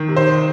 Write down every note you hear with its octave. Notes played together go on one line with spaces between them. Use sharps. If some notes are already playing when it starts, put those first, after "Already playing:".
Already playing: D#3
C3
C5